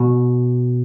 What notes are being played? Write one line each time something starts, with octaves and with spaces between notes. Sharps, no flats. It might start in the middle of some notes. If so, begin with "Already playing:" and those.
Already playing: B2